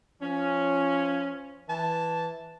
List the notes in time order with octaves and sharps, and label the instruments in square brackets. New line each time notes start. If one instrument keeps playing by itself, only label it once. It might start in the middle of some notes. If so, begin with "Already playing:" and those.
[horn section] F3 C#4
E3 A5